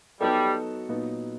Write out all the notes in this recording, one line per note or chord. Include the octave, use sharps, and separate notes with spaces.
F#3 G3 B3 D#4 F#4 A4
A#2 F#3 B3 D#4